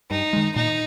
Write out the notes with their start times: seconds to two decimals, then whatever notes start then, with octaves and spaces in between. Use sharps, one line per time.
0.11 G2 D#4
0.33 D#3 G#3
0.56 A#2 D#4